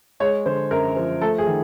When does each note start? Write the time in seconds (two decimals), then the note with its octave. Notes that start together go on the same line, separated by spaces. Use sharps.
0.20 G#3 C#5
0.46 D3 C5
0.71 F#2 A#4
0.96 F3
1.21 A3 A4
1.38 G#4
1.47 D#3